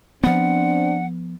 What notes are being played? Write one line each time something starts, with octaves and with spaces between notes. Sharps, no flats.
F3 B3 C4 D4 F#5